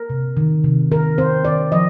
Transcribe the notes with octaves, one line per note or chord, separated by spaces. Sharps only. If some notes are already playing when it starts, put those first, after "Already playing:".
Already playing: A#4
C3
D#3
C3
D#3 A#4
C4 C5
D#3 D5
F3 D#5